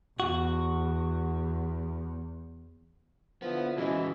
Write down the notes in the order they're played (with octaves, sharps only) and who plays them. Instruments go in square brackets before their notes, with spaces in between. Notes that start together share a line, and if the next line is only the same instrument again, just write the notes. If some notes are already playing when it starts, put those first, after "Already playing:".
[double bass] E2 [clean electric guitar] F#4
[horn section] D3 F3 E4 [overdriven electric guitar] B3
[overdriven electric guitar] C#3 E3 [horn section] G#3 E4 [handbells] F#4 D#5